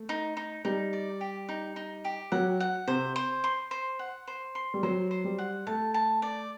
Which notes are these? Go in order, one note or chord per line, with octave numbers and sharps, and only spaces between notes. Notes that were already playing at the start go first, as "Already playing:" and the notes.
Already playing: A3
D#4
D#4
G3 D#4
D5
G4
D#4
D#4
G4
F#3 F#5
F#5
C3 C5
C5
C6
C5
F#5
C5
C6
G3
F#3 C5
C5
G3
F#5
A3 A5
A5
D5